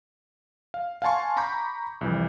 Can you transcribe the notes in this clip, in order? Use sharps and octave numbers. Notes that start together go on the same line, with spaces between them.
F5
F5 F#5 G#5 A5 C6 C#6
A#5 B5 C#6 D6 G6
C2 F2 E3